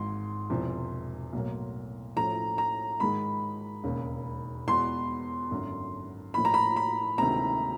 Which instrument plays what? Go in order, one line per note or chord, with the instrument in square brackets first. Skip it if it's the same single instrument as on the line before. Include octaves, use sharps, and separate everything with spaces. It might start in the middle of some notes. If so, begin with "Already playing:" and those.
Already playing: [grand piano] G#1 G#2 E3 [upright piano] C6
[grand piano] E1 E2 C3 F3
B1 A2 F#3 A#3
[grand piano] A2 F3 A3 C#4 E4 [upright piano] A#5
[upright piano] A#5
[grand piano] G#2 D#3 G#3 [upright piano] B5
[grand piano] E1 D#2 C#3
[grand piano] E2 B2 G#3 B3 [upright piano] C6
[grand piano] G#1 F#2 D3
[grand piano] A2 F3 A#3 D#4 [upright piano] B5
[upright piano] A#5
B5
B5
[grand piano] D2 C3 D#3 G#3 C4 [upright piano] A#5